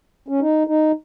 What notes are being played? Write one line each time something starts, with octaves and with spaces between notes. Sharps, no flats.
C#4
D#4
D#4